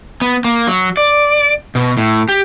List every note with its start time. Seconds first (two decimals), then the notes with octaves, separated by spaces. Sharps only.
0.21 B3
0.44 A#3
0.67 F#3
0.97 D5
1.75 B2
1.97 A2
2.29 G4